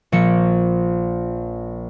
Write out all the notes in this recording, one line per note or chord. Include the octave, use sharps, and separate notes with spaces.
A#1 F3 A#3 C#7